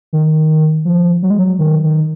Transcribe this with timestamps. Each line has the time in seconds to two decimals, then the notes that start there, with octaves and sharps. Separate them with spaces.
0.13 D#3
0.85 F3
1.23 F#3
1.30 G#3
1.39 F#3
1.59 D#3
1.83 D#3